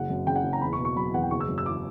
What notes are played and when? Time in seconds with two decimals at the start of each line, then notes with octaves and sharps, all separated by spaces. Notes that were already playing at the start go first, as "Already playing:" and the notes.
Already playing: F#1 F#5
0.09 F#2
0.26 C#3 G5
0.36 F#5
0.44 F#1
0.53 A#5
0.61 E2 B5
0.73 C#6
0.79 B2
0.85 C#6
0.96 F#3 B5
1.14 E2 F#5
1.23 G5
1.31 F#1 C#6
1.41 E6
1.48 F#2
1.58 E6
1.66 E3 D6